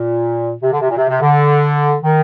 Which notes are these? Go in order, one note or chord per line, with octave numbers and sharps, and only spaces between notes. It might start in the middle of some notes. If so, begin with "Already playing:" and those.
Already playing: A#2
C3
D3
C3
A#2
C3
C3
D3
D#3